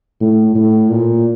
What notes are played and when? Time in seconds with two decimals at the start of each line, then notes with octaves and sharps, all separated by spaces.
0.21 A2
0.55 A2
0.90 A#2